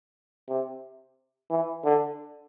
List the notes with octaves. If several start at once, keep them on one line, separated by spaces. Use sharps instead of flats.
C3
E3
D3